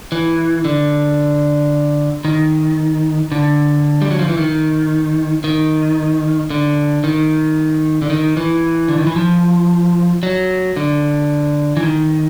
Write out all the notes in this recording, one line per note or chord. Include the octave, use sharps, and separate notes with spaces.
E3
D3
D#3
D3
G3
F#3
F3
E3
D#3
D#3
D3
D#3
D3
D#3
E3
D3
D#3
E3
F3
F#3
D3
E3
D#3